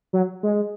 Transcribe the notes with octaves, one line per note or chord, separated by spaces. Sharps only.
F#3
G#3